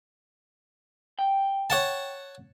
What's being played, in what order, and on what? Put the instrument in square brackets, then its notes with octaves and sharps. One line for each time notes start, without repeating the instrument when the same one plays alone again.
[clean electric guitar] G5
[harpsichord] C#5 F#5 A5